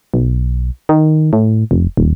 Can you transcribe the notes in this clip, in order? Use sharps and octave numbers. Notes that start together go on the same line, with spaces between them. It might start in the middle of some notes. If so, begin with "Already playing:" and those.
B1
D#3
A2
F1
D#1